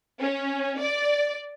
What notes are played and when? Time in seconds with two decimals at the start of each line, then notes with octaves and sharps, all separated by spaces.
0.21 C#4
0.81 D5